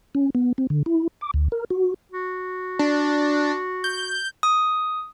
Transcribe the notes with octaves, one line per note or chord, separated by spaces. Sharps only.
C#4
B3
C4
D3
E4
D6
D2
A#4
F#4
F#4
D4
G6
D#6